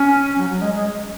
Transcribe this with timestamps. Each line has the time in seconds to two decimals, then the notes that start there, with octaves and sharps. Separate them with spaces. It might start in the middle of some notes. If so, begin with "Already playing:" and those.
Already playing: C#4
0.38 F#3
0.50 F#3
0.62 G#3
0.74 G#3